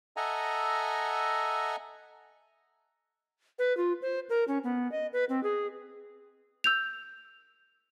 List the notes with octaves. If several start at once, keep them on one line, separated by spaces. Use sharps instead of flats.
A4 D#5 E5 F#5 G#5 A#5
B4
F4
C5
A#4
C#4
B3
D#5
B4
C4
G#4
E6 G6 F7